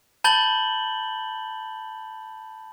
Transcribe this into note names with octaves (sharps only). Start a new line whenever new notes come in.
A5 B5 G6 A6 F#7 G7